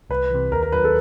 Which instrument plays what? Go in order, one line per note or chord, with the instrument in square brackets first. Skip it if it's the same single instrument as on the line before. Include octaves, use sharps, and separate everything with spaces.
[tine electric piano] C2 [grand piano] B4
[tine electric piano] C3 E3
[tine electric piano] D#2 [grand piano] A#4
[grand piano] A#4
[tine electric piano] D#3 F#3 [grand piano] B4
[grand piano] A4